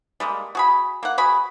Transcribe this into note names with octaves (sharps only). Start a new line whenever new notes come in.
G3 G#3 A#3
F#4 G#4 B5
A#3 F#5
F#4 G#4 B5